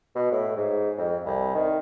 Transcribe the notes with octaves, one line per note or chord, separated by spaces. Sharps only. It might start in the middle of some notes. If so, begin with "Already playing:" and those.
B2
A2
G#2
F2
C2
D#3